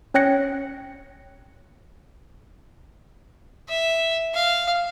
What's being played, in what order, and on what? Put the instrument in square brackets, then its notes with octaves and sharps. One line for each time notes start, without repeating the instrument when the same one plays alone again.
[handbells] C#4 C#5 G5 F#6 A#6 C#7
[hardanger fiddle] E5
F5